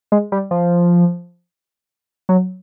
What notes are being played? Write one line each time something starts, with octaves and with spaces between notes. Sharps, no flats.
G#3
G3
F3
F#3